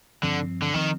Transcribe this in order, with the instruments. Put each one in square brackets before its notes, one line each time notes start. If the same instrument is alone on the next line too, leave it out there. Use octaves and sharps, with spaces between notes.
[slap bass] G2 F3 C4 [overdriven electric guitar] D3
[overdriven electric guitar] D3
[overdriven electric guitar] D#3 [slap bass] F3 C4